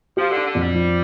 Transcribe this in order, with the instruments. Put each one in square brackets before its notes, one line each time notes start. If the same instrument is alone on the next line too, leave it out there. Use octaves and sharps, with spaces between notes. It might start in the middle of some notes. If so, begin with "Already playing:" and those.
[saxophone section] F3 [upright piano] G4
[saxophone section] D3
[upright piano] D4
[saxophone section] D3
[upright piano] F2
[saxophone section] G3
[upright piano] F3